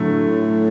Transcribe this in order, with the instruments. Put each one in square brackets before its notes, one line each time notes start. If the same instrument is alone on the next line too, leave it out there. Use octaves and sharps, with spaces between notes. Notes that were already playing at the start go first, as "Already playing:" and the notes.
Already playing: [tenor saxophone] A2 [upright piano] D3 F#3 A3